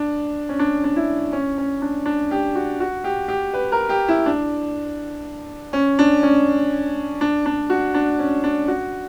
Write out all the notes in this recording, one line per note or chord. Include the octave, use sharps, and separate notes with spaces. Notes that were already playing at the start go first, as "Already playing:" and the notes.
Already playing: D4
C#4
D4
D4
E4
C#4
C#4
D4
D4
G4
F#4
F#4
G4
G4
B4
A#4
G4
E4
D4
C#4
D4
C#4
D4
D4
F#4
D4
C#4
D4
F#4